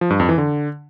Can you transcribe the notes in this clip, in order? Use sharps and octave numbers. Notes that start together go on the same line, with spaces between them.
F3
G2
F2
E3
D3